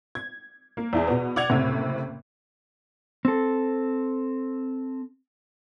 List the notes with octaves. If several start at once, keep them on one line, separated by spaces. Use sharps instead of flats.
G#6
A#3
E2 E4 G#4
B2 B3
D5 F#5 G#6 F7
F#1 A2 C3
C4 A4